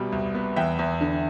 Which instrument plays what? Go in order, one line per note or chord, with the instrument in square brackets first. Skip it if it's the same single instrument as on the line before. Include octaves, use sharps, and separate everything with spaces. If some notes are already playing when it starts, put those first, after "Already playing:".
Already playing: [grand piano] C2 B2 G3 B3
C2
B3
E2 E5 G5
E2
D3